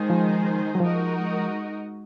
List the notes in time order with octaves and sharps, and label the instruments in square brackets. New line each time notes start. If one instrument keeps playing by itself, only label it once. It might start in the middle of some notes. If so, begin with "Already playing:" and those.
Already playing: [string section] D#3 G#3 D#4 G#4 C5
[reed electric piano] F3
F#3
[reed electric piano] F3 [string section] G#3 D#4 F#4 A#4 D#5